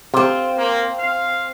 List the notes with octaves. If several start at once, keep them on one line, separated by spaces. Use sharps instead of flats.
C3 C4 F4
A#3
F5